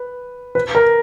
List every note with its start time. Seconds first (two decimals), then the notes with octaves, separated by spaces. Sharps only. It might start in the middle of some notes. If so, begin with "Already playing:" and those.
Already playing: B4
0.55 B4
0.75 A#4